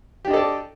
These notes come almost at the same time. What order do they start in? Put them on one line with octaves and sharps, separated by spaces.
G4 D4 D#5 A4 D5